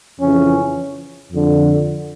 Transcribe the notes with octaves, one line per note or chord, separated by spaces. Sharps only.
F2 C#3 E3 C#4
F2 D3